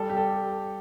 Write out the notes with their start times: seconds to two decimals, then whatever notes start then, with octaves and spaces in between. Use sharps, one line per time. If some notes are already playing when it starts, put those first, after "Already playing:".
Already playing: G3 A4
0.10 G4
0.17 A4